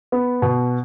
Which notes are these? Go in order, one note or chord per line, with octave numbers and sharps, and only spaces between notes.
B3
B2